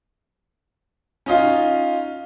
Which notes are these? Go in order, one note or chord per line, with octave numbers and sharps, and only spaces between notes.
C#4 D#4 F4